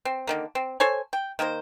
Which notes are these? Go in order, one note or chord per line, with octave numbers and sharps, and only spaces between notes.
C4
D3 D#3 A#3
C4
A4 C5 C#5 G#5
G5
D#3 A#3 A#4 C5